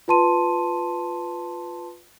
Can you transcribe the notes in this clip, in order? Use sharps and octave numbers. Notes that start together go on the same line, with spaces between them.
F4 B4 A5 C6 D#7